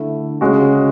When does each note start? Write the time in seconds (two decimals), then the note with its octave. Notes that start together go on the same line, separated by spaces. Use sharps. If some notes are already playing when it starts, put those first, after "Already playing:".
Already playing: D3 A3 E4
0.41 C#3 G#3 C#4 F#4